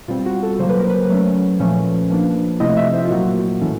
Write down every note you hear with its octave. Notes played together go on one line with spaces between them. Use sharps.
B2 G3 C4 F4
F#4
A4
C#3 F#3 A#3 C5
B4
A#4
B4
F#3 A3 C#4
A#2 F3 A3 C#4
F3 A#3 D4
C3 F3 A3 C4 E4 D#5
E5
C5
F4
A#2 F#3 A#3 F#4
A2 E3 A3 C#4 E4